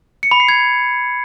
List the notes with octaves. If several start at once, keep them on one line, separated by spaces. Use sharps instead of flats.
C#7
B5
C7
G#6